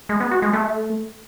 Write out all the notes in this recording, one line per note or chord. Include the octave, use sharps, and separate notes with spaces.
G#3
B3
F#4
G#3
A3